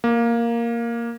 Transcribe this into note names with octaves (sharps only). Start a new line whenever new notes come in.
A#3